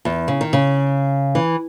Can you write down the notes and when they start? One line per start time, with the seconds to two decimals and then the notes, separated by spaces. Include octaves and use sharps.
0.05 E2
0.28 C#3
0.41 D#3
0.53 C#3
1.35 E3